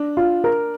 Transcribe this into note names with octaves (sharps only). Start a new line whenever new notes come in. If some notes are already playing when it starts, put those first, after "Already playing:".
Already playing: D4
F4
A#4